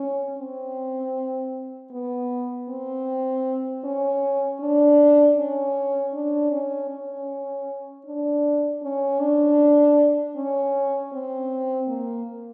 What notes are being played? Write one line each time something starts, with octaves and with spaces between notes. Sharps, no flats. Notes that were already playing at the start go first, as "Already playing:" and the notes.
Already playing: C#4
C4
B3
C4
C#4
D4
C#4
D4
C#4
C#4
D4
C#4
D4
C#4
C4
A#3